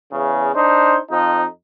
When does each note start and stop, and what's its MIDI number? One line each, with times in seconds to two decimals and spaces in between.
0.12 0.49 40
0.12 0.49 49
0.54 0.96 62
0.54 0.96 63
0.54 0.96 72
1.10 1.43 41
1.10 1.43 53
1.10 1.43 63